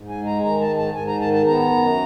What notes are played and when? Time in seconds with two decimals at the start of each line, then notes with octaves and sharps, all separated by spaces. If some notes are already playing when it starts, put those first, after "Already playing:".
Already playing: G#2
0.09 G#5
0.17 G#3
0.26 A#5
0.43 D#3 A#5
0.60 A5
0.69 G#2
0.78 A5
0.94 G#2 G#5
1.08 A#5
1.20 D#3 A5
1.33 A5
1.46 B3 A#5
1.72 F#2